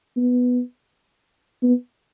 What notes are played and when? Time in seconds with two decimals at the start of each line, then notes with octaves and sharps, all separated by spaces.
0.17 B3
1.63 B3